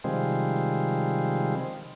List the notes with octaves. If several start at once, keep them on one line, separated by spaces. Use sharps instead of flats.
C3 D#3 F3 G3 G#3 C4